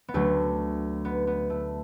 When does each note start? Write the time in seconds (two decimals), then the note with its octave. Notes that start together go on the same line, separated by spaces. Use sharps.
0.08 B3
0.14 D2 D3 F#3 A3
1.05 B3
1.27 B3
1.50 A3